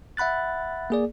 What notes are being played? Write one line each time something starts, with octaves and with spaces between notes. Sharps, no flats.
E5 F#5 B5 F#6 A6
A#3 G#4 D5